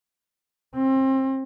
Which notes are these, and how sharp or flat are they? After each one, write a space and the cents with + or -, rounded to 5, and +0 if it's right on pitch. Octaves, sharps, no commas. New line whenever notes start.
C4 +30